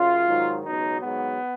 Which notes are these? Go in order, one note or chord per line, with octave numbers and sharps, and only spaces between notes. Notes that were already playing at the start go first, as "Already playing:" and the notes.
Already playing: F#2 C#3 F4
G#2 D#3 F#3
C#2 B2 F#3 D#4
G#2 F#3 B3